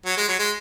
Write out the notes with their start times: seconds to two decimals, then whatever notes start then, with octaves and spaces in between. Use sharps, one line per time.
0.06 F#3
0.17 G#3
0.28 F#3
0.39 G#3